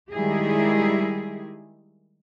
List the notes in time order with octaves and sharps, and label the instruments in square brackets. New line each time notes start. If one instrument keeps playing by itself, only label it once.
[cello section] D#3 G3 G#3 E4 G4 G#4